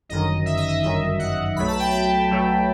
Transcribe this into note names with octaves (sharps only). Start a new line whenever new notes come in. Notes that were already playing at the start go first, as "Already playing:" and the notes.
G1 F#2 D#3 D#5
E5
D#5
E5
G1 F#2 D#3 E5
F#5
B1 B2 F#3 A3 B5
A5
G5
A5
B1 B2 F#3 A3